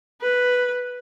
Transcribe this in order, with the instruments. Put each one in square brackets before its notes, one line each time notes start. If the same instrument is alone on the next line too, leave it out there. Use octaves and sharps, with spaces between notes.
[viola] B4